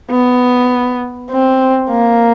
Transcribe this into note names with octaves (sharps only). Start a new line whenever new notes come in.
B3
C4
A#3